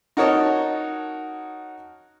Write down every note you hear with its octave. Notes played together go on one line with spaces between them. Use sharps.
D#4 F#4 A#4 C#5 D#5 A5